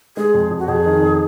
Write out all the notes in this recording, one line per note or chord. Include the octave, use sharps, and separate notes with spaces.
G#3 G#4
F2
F2
F#4
F2 G#4
D#3
F2